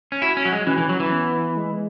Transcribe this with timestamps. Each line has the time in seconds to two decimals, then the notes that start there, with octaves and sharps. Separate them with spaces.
0.12 C#4
0.22 E4 F#4
0.37 C#4
0.45 F#3
0.52 G#3
0.67 E3 C#4
0.78 E3
0.89 F#3
1.00 E3
1.11 B3
1.57 G#3